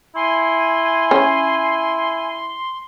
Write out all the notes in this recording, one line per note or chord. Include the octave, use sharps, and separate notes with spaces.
E4 G#5 C6
C#4